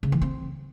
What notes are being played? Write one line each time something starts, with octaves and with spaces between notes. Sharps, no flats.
C#3
E3
C4